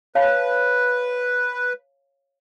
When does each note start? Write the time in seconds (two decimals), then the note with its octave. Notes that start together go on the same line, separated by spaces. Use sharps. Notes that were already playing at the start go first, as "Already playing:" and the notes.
0.15 B4 C#5 F5 A5